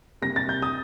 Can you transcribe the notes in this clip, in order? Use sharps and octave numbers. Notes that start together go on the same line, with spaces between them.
C3 G3 A#3 A#6
A6
G6
D#6